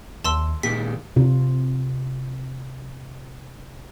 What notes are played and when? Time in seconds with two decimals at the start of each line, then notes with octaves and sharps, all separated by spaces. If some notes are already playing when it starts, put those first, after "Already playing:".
0.24 D#2 A5 C6 E6
0.63 A#2 D#3 G#3 G4 B6
1.16 C3 F4